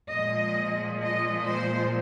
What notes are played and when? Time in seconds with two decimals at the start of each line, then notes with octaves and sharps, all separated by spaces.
0.10 A#2 F3 G#3 D#5
1.02 D#5
1.47 C5